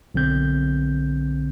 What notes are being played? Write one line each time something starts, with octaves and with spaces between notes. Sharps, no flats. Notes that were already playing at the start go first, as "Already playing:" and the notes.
B1 D3 C4 G6